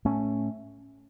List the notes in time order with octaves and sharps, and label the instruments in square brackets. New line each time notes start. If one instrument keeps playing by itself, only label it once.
[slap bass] A2 A3 C#4